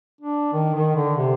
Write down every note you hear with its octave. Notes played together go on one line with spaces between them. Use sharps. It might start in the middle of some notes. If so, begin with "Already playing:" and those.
D4
D#3
D#3
D3
C3